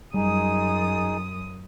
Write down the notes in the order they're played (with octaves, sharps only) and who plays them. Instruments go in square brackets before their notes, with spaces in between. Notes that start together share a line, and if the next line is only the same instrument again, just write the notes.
[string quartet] F#2 D#6 [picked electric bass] G3 [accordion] D#4 G#4